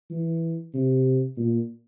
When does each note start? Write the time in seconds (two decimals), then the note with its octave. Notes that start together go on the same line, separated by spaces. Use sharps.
0.10 E3
0.74 C3
1.37 A#2